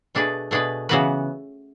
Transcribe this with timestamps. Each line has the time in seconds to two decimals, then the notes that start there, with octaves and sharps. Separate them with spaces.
0.15 B2 A3 D4 G#4 B4
0.51 B2 A3 D4 G#4 B4
0.89 C#3 E3 B3 F#4 B4